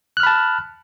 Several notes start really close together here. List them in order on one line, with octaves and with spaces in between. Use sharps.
F#6 F6 B5 A5